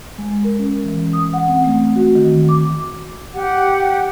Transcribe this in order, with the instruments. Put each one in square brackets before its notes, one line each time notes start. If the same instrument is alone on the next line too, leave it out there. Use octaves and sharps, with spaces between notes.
[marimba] G#3
A#4
C#4
E3
D#6
F#5
C4
A3
F#4
D#3
D6
[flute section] G4 F#5